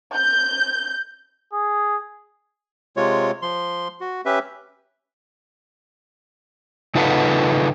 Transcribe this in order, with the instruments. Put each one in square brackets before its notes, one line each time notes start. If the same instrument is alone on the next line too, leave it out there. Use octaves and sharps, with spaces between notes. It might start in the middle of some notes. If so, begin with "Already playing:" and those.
[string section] G6
[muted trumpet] G#4
[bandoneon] C3 G#3 F4 C#5
F3 C6
F#4
C#4 G4 B4 E5
[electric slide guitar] C#3 D#4 F4 A4 B4 F#5